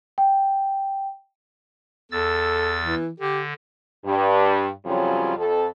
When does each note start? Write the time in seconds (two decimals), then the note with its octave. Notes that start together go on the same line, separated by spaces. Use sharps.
0.18 G5
2.11 E2 A4 E6 A6
2.82 E3
3.20 D3 G4
4.05 G2
4.85 F2 C#3 F#3 G3 C#4 F4
5.37 F2 A4